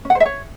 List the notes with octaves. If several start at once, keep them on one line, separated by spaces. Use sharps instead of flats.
C#4
F#5
C5
E5
C#5